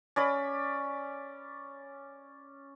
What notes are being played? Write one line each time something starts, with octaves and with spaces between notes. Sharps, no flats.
C#4 D5 B5